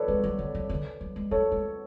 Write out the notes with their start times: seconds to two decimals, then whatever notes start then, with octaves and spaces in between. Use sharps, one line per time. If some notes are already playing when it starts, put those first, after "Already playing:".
Already playing: A4 B4 C#5 D5
0.08 G#3
0.24 F#3
0.39 D3
0.55 F#3
0.69 D3
1.01 F#3
1.16 G#3
1.31 A3 A4 C#5
1.52 G#3